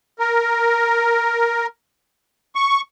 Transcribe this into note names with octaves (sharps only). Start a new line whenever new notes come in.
A#4
C#6